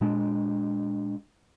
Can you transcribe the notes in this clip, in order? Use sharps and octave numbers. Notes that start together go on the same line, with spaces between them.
A#2 G#3 D4